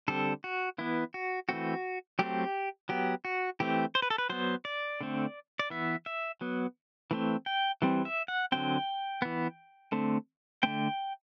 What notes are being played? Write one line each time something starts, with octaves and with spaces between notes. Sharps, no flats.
D3 G3 C4 A4
F#4
E3 B3 E4
F#4
E3 A3 C4 F#4
F#3 A3 C4 G4
F#3 B3 G4
F#4
E3 A3 C4 G4
C5
B4
A4
B4
F#3 B3 C5
D5
D3 A3 C4
D5
E3 B3 E5
E5
F#3 B3
E3 A3 C4
G5
E3 G3 C4
E5
F#5
D3 F#3 C4 G5
E3 B3
D3 A3 C4
D3 A3 C4 G5